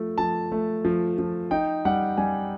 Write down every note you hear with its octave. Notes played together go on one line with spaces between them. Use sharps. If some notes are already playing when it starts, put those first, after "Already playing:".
Already playing: F3 A3
F3 A5
A3
F3
F3
D#4 G5
G3 F#5
G3 G#5